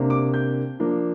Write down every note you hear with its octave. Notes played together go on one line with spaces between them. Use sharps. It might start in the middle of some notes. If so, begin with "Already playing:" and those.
Already playing: C3 A#3 D4
D6
G6
F3 A#3 D4